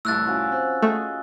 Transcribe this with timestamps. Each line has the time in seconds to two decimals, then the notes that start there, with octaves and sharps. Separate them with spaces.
0.05 C2 A2 E6 F#6 A6
0.26 C#4 F4 F#4
0.52 C4
0.82 A3 G#4 D#5